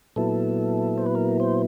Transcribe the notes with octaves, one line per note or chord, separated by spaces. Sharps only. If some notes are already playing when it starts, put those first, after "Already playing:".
A#2 F#3 B3 E4 A4
C5
B4
A#4
C5